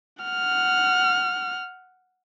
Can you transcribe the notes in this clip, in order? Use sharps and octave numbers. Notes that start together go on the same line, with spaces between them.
F#5 F6